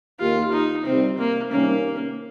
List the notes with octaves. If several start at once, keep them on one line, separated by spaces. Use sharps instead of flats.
D#2 D#3 A#3 D#4 F4 G4
D#4
C3 D#3 G3 C4
A#3
C3 D#3 G3 A#3 C#4